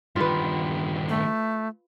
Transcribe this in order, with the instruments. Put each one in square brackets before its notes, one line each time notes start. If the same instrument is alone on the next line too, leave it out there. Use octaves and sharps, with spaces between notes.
[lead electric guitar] G2 D#3 [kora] F4 B4
[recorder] A3